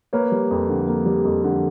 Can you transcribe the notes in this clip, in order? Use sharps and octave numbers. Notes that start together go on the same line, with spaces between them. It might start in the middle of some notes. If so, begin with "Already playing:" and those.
A#3 B4 C#5
G3
F2
D3
A#3
G3
F2
D3